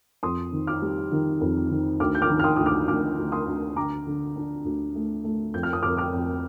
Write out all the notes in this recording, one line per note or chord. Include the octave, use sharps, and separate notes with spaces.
F2 C6 D#6
D#3
D6 F6
G3
D#3
F2
D#3
D2 D6 F6
G6
D6 F6
D#3
F6
C6 D#6
D2 D#6
D6 F6
D2 D6 F6
D2
C6 D#6
D2
D3 A#5 D6
D3
D4
D2
A3
A3
F2 G6
F6
D#6
F2 D6 F6
D6 F6
F2